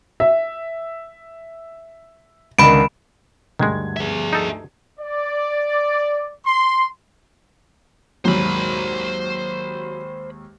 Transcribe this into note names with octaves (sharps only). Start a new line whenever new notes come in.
E5
C#2 D3 D#3 B5 D7
D2 G2 D#3 G#3 G#6
G#4 E5
D#4 A4
D5
C6
D#2 G#2 F#3 C5 B5